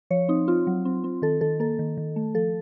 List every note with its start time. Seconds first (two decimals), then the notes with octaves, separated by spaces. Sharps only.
0.11 F3 C#5
0.29 C4 D#4
0.48 C4 F4
0.67 F#3
0.85 C4
1.04 C4
1.22 D#3 A4
1.41 D#3 A4
1.60 A#3 A4
1.79 D#3
1.97 D#3
2.16 A3
2.34 F3 A4